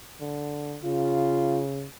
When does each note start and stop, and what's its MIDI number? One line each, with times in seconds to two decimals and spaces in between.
0.21 0.78 50
0.84 1.86 49
0.84 1.62 65